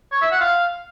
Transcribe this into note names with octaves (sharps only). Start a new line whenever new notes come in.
C#5
E5
F#5
F5